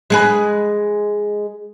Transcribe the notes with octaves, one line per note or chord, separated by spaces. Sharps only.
G#3 G#4 B4